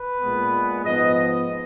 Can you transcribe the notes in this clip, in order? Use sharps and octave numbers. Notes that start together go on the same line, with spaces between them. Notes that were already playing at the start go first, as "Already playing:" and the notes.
Already playing: B4
A#2 G#3 B3
G#2 F3 B3 D#5
D#5